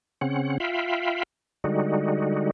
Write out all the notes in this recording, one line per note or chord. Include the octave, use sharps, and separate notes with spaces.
C#3 C4 C#4 F#5
F4 E5 F5 G5 B5
D3 G3 G#3 D#4 F#4